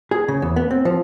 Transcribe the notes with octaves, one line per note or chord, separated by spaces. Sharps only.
G#4
C#3
E2
B3
C4
F3